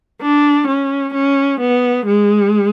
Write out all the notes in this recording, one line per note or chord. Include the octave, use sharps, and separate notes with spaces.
D4
C#4
C#4
B3
G#3